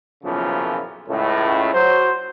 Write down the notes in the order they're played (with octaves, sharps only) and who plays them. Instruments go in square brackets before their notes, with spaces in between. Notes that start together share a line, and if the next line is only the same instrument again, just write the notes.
[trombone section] B1 F#2 A#2 C#3 E3 F3
C#2 A2
F#3 C5